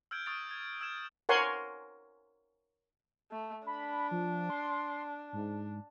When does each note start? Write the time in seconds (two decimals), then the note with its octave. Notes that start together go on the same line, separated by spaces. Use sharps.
0.11 E6 F6 G6 G#6 D7
0.26 C#6 D#6 F6 A6 D7
0.51 G#6
0.81 E6 F6 G#6 E7
1.29 A#4 C5 C#5 F#5 G#5 C6
3.31 A3
3.67 D4 B5
4.11 F3
4.50 C6
5.33 G#2